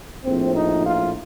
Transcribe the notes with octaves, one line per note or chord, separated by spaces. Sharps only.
A#1 A2 F3 C4
D#4
F4